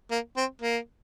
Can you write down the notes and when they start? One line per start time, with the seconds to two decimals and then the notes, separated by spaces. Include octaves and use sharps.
0.11 A#3
0.37 C4
0.62 A#3